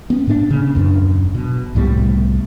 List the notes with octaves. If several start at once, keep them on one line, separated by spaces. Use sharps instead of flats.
B3 C#4
A2 A#3 B3 D4
C#3
D#1 F#2 A3 D4
B2
C2 A2 G3 B3